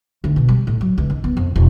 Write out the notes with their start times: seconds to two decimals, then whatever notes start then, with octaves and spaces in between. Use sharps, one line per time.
0.24 D2
0.36 B2
0.49 G3
0.67 A2
0.81 F#3
0.98 C#2
1.10 D#3
1.24 B3
1.37 F2
1.56 E1